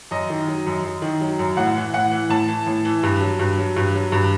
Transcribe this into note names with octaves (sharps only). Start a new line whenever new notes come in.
F#2 D#5
D#3
F#3
F#2
F#2
D#3
F#3
F#2
A2 F#5
E3
A2 F#5
E3
A2 A5
E3
A2
E3
G2
F#3
G2
F#3
G2
F#3
G2